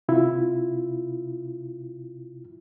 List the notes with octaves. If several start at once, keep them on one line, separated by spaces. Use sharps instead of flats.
C3 E4 F4